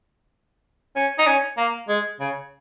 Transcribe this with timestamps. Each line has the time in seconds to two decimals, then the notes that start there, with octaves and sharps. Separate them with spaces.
0.96 C#4
1.18 D#4
1.27 C#4
1.57 A#3
1.89 G#3
2.20 C#3